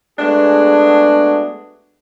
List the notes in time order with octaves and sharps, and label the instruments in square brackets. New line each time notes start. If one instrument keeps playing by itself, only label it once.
[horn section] G#3 A3 B3 D4 F#4 G#4